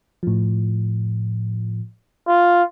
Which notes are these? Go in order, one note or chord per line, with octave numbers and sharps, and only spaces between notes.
A2 F3
F4